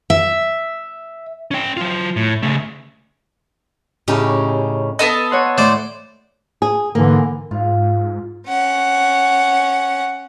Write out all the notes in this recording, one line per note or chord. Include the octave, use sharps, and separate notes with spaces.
E5
C#4 G5
F#3 F4
A2
C#3 A3
A2 C#3 C#4 D#4 G4
B3 A4 D#5
C#5 F#5 C6
A2 C5 D5
G#4
G#2 D3 E3 A#3
G#2 F4
C#4 F#5